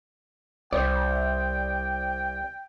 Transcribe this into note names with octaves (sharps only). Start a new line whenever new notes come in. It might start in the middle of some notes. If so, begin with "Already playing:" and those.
C2 C5 D5 G5